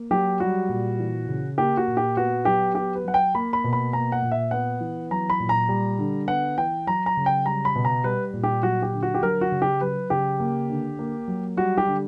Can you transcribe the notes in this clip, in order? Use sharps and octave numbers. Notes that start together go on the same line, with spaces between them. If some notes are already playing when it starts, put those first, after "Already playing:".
Already playing: A#3
F#3 G4
G3 F#4
A#2
E3
C#3
A#3 G4
F#4
A#2
G4
B3 F#4
F#3 G4
B3 G4
B4
F#3 F#5
G5
A#3 B5
B5
B2
B5
A#3 A#5
F#5
A#2
E5
B3 F#5
E3
F#3 A#5
B5
A#2
A#5
G3
D3
B3 F#5
E3 G5
F#3 A#5
A#5
C#3
G5
G3 A#5
B5
B2
A#5
G3 B4
A#2
G4
F#3 F#4
G4
D3
F#4
G4
F#3 A#4
F#4
C#3
G4
F#3 B4
C#3 G4
A#3
D3
A#3
F#3
G3 F#4
G4
D3